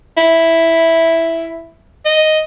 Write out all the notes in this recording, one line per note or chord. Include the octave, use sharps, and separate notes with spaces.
E4
D#5